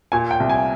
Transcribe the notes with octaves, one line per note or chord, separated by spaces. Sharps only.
A#2 G#5
G5
C2
G#5